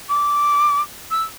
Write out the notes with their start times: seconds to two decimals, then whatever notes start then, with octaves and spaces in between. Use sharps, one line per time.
0.09 D6
1.11 E6